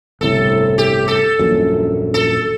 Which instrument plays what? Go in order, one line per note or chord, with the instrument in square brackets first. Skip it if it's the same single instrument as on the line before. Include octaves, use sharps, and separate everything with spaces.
[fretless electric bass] G1 C2 A2 [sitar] A4
[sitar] G4
A4
[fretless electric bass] D#1 A#1 F#2
[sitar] A4